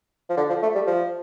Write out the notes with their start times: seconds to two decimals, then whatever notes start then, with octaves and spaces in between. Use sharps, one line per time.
0.29 F3
0.37 D3
0.49 F3
0.62 A3
0.75 G3
0.87 F3